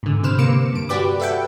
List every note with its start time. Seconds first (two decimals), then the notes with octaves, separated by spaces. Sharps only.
0.03 G#2 D3
0.23 C3 B4 C5 F6 E7
0.38 C3 A#3 D6 C#7 E7
0.73 G2 D7
0.89 F#4 G4 B4 D5 B5 D6
1.20 A4 B4 E5 F#5 G5